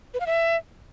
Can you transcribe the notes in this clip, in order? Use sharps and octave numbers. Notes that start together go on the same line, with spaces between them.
B4
F5
E5